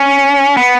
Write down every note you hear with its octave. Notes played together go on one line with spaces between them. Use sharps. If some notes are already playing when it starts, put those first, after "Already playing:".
Already playing: C#4
B3